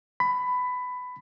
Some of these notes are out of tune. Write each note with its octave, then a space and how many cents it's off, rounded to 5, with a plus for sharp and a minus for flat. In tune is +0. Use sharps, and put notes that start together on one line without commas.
B5 +15